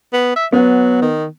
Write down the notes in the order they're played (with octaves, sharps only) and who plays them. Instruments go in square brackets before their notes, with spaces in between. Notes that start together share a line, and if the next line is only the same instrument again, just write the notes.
[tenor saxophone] B3
E5
[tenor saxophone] F#3 [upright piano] B3
[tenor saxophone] D#3